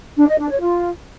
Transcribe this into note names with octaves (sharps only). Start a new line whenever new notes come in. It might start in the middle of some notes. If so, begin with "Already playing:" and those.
D4
D#5
D4
C#5
F4